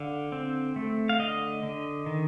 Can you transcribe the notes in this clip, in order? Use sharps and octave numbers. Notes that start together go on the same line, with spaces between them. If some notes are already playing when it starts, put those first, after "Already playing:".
Already playing: D3 F5
C4
A3
F5
D3 D#5
D3
D#3